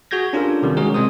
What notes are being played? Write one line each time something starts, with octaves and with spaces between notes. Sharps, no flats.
F#4 G#4 G6 G#6 A#6
C#4 D4 F4 G4 A4 A#4
C3 D#3 G3
G#3 C#4 F#4 G#4 A#4
C2 G#3 C4 C5 D#6